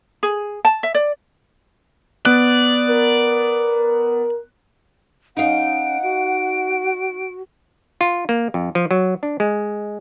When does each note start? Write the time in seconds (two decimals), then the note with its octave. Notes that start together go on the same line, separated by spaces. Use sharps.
0.23 G#4
0.65 A5
0.83 E5
0.95 D5
2.25 B3 D5 F#6
2.88 A#4
5.37 C#4 D#4 F5 F#5 D7
6.02 F#4 D7
8.01 F4
8.29 A#3
8.54 F2
8.75 F3
8.91 F#3
9.23 D4
9.40 G#3